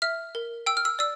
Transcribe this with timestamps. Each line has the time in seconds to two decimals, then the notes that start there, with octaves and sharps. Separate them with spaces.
0.02 E5 F6
0.35 A#4
0.66 G5 E6
0.77 F6
0.85 E6
0.99 D5 E6